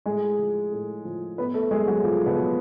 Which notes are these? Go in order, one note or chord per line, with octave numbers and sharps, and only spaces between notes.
A2 G#3 G#4
F3
A2
F3
A2 B3 B4
A3 A4
F#3 G#3 G#4
F#3 F#4
A2 F3 F4
B2 B3
F#3